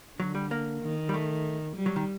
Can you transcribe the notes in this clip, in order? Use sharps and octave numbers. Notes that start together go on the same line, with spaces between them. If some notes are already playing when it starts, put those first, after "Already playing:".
D3 F#3
G3
A#3
D#3
G3
A3
G3
F#3
D#3